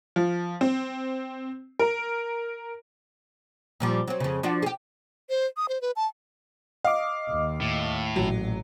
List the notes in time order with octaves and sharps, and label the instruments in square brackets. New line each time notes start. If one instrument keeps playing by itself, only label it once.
[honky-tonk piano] F3
C4
A#4
[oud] A#2 F3 G3
F#3 C4
F2 C#3
F3 D4 F#4
G4 G#4
[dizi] C5
D#6
C5
B4
A5
[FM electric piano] D#5 D6 [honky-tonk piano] F5
[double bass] D#2
[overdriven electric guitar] A2
[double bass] A1 A#2 [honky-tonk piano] F#3